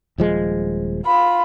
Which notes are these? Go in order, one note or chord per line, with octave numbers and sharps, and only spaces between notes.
D#1 F3 G#3
F4 B5